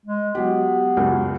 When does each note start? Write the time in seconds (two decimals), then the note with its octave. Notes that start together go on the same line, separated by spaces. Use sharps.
0.06 G#3
0.35 F#3 B3 G4
0.97 C#2 F#2 A#3